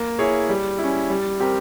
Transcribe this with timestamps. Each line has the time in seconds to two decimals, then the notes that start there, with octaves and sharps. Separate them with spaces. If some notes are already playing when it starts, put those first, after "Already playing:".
Already playing: A#3
0.19 E4 G#4 C#5
0.49 G3
0.78 E4
0.84 C#4
1.10 G3
1.40 C4 G4 A#4